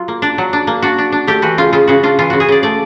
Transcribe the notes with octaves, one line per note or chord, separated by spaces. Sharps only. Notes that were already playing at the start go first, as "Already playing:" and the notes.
Already playing: F#3 F4
A#3
D4
F#3
D4
A#3
D4 F#4
D4
D4
A3 G4
E3 F#4
C#3 F4
C#3 F4
C#3 F#4
D4 F4
E3 F4
C#3 F#4
G#4
C#3 D5
A3 D5